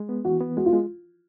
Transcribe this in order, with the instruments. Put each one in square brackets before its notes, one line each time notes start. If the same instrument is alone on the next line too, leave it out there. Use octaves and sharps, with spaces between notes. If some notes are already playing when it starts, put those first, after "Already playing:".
Already playing: [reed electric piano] G#3
B3
[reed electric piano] E3 [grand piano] F#4
[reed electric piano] B3
[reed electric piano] G#3 [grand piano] F#4
[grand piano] F4
[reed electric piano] G#3